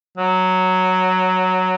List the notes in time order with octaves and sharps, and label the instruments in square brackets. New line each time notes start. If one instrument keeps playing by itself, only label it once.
[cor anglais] F#3